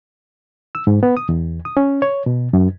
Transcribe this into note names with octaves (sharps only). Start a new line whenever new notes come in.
E6
G#2
B3
D#6
E2
D#6
C#4
C#5
B2
F#2